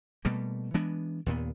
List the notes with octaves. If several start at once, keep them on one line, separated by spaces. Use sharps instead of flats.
B2 G3 A3 A#3
E3 G#3 B3 D4
D#2 A#2 B3